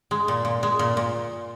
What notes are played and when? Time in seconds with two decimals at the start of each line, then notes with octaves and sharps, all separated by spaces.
0.11 G#3
0.28 A#2
0.45 A#2
0.63 G#3
0.79 A#2
0.97 A#2